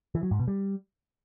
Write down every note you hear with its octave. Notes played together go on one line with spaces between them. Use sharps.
E3
F#3
G#2
B2
G3